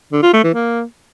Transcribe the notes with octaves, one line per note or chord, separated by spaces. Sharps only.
D3
F4
A3
E3
A#3